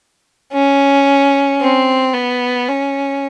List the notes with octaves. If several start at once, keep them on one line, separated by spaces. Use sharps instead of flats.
C#4
C4
B3
C#4